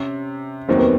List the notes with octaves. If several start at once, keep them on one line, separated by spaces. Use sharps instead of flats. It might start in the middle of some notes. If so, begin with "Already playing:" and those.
Already playing: C3 C#4
F1 D#2 D#3 F#3 A#3 C4
B3